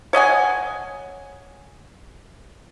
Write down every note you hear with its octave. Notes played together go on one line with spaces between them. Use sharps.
C#5 D#5 F#5 G#5